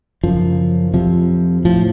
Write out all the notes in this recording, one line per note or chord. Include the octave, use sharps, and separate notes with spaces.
F#2 C#3 F3
F2 C3 F3
A2 F3